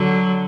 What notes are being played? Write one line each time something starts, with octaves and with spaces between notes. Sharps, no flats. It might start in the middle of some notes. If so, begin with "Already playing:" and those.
Already playing: D3 F#3